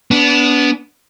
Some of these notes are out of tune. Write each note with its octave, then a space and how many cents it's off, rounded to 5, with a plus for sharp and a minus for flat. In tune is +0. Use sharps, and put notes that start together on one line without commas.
B3 +0 D4 -30